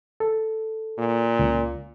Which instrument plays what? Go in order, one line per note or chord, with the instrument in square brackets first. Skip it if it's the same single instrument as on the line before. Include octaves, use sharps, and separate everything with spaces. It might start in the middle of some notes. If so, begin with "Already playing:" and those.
[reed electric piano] A4
[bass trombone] A#2
[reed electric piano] C#2